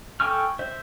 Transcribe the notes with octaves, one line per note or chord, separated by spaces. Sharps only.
A4 G5 G#5 C#6 F6
C5 E5